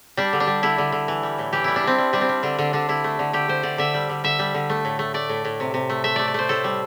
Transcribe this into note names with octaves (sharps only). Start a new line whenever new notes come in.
G3 D4
D3
D4
G3
D3 E4
D3
D3
E3
G3
A2
E3 G4
G3 E4
D4
G3 C4
G3
G3 D4
C4
G3
D3 D4
D3 D4
D3 D4
D3 E4
A3
D3
D3 G4
D3 C5
D3 D5
D3 E5
G3
D3
D3 E5
G3
D3
A3
A2
A3
A3 D5
A2
A2
C3
C3
A3
A3 E5
A3 D5
D5
A3 C5
A2 A4
G3